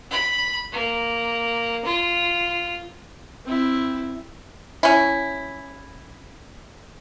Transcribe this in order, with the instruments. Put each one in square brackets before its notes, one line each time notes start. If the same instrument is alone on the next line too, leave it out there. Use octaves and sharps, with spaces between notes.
[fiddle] B5
A#3
F4
[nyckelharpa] C4 E4
[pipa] C#4 E4